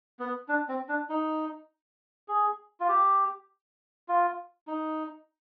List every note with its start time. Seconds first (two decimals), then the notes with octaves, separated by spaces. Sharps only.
0.19 B3
0.48 D4
0.69 C4
0.89 D4
1.09 D#4
2.28 G#4
2.80 F4
2.89 G4
4.08 F4
4.67 D#4